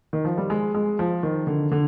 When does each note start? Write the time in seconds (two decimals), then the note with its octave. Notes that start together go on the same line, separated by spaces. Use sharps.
0.13 D#3
0.25 F3
0.38 G3
0.50 G#3
0.75 G#3
0.99 F3
1.23 D#3
1.47 D3
1.72 D3